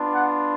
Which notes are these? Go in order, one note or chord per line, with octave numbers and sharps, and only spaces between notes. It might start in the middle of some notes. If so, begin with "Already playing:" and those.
Already playing: B3 D4 F4
F#5